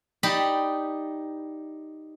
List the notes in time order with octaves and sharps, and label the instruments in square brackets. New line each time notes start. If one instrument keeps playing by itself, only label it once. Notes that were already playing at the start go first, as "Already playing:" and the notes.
[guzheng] D#4 G4 D5 A5 B5